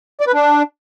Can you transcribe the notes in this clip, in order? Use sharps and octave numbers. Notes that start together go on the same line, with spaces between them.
D5
B4
D4